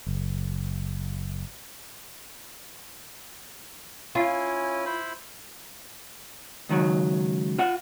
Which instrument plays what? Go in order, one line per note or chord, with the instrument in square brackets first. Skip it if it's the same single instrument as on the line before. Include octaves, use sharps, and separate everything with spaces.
[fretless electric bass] F#1
[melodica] C#4 E4 G#5 [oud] F4
[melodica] E4 C5 B5
[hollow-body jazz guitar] C#2 D#3 F#3
F4 F#5